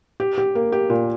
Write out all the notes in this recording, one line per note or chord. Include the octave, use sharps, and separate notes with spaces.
G4
G4
A#3
G4
A#2